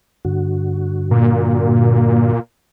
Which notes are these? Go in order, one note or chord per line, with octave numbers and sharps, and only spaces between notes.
G2 D3 F#4
A#2